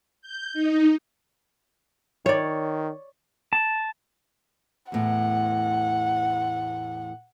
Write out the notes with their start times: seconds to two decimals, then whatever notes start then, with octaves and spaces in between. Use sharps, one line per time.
0.21 G6
0.53 D#4
2.26 D#3 C#5 D5
3.53 A5
4.92 E2 A2 F#5